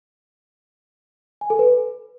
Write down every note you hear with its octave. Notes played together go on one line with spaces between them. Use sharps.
G#5
A4
B4